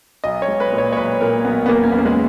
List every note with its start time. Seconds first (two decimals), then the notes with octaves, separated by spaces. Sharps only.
0.24 B1 D#5
0.42 C#5
0.48 G#3
0.60 B4
0.72 A#2
0.78 C#5
0.93 C#5
0.97 B1 B4
1.21 A#2 A#4
1.45 B1 B3
1.66 B3
1.69 E2 A#3
1.84 C#4
1.92 E2 B3
1.99 A#3
2.05 G#3